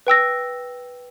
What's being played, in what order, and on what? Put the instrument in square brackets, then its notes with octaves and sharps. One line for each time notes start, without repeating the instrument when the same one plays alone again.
[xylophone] B4 G5 E6 A#6